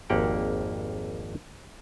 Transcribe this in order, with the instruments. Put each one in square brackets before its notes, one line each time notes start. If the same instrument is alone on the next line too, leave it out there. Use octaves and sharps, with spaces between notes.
[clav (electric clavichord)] G#1 F2 A#3 G4 F#5 G5